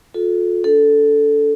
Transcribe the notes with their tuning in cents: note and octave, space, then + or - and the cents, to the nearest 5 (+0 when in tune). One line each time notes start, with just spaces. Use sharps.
F4 +35 A4 -15
D4 -25 A4 +0